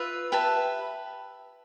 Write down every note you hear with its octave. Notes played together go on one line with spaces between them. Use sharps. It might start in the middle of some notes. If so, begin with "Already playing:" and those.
Already playing: F4 B4 E5
G4 B4 E5 A5